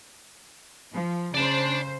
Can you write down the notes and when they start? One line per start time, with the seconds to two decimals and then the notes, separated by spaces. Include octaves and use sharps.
0.92 F3
1.35 C#3 C5 D5 A5